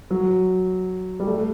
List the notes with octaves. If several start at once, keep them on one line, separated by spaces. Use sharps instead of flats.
F#3
G3
A3